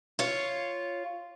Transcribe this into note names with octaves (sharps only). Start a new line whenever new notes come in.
F4 C#5